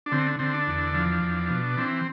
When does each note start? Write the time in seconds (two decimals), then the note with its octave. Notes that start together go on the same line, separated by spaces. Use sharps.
0.06 D4
0.12 D3 C4
0.39 D3 C4
0.54 D4
0.68 E2
0.94 F3
1.22 E2
1.50 B2
1.77 E3 C4